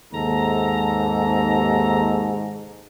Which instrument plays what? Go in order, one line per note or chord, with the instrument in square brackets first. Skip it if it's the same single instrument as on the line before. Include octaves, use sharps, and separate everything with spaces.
[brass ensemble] D#2 C3 [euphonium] G#2 [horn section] A4 A#5